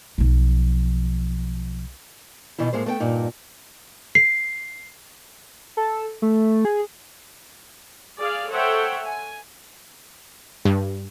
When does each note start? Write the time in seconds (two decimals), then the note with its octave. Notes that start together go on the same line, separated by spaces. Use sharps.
0.18 B1 F3
2.58 B2 D#3 E3 E4
2.73 A2 G#3 A#3 C5
2.86 A3 B3 D5 G5
3.00 G2 A#2 D#4
4.15 C7
5.77 A4
6.22 A3
6.65 G#4
8.19 G#4 D5 F5
8.50 A4 C5 C#5 E5 F#5 G5
9.06 G#5
10.65 G2